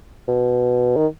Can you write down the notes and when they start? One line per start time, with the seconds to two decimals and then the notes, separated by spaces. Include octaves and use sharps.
0.28 B2
0.96 D#3